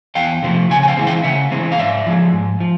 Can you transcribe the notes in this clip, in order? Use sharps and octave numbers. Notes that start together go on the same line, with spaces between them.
E2 F5 G5
C3 F3 A3
C#3 F#5 G#5
G#5
F5 G5
E3 G#3 C4
F5 G5
C#3 E5 F#5
E3 G#3 C4
F5
G#2 D5 E5
F3 G#3
G#2
F3